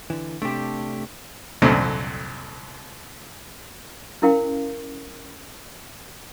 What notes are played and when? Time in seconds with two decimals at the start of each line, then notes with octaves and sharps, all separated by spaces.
0.10 D3 E3
0.42 C3 A3 D4 G4
1.62 C2 F2 A#2 D3 F#3 C4
4.22 C#4 E4 A#4 F5 G5